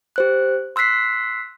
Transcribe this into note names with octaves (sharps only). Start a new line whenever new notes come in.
G4 C5 F#6
C6 E6 F#6 B6 C7